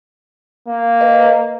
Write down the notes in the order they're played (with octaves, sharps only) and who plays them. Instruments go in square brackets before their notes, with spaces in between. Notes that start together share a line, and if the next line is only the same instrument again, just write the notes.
[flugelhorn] A#3
[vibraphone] B4 D#5